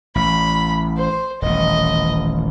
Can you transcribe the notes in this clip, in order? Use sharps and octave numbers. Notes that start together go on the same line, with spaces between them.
A1 B5
C5
D#1 A1 D#5